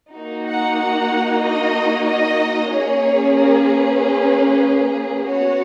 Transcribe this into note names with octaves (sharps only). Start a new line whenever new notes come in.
A#3 D#4 F#4
F#5
F#5
D#5
D#5
A#3 C#4 G#4 C#5
A#4
B4
B3 F#4 C#5